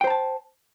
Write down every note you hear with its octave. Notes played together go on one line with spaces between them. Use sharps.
C5 G5 A5 A#5